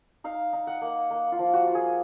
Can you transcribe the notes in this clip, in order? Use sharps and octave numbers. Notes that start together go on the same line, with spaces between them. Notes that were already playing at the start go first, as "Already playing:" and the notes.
D#4 F5
D#4
F#5
A#3
A#3
F4
F3
F#4
F4
G#4